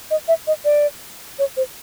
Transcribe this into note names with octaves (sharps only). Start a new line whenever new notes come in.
D#5
E5
D#5
D5
C#5
C5